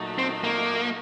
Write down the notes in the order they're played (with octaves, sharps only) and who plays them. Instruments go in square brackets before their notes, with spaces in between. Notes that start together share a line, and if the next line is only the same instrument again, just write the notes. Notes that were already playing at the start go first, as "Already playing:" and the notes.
Already playing: [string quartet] A#2 F#3 A3 D#4
[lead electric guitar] C4
A#3